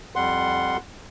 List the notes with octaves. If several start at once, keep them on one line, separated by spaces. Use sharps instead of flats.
F2 G3 F#5 C6